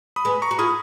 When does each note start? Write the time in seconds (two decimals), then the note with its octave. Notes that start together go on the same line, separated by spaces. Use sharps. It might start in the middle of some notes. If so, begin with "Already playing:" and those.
0.16 B5 D#6
0.25 G#3 B3
0.42 A#5 C#6
0.51 F#4
0.58 F4 G#4 B5 D#6